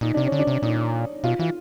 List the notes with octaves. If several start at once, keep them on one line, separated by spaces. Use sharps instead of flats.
A#2 D#4
C3 D4
C#4
D3
D4
C3
A#2 D#4
B2 F4
E3 F4